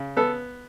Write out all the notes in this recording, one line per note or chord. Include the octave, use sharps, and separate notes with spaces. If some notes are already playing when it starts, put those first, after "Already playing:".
Already playing: C#3
B3 A4